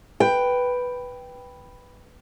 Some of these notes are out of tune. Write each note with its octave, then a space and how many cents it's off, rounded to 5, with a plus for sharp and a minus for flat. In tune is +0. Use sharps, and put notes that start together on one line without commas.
B4 +0 G5 +0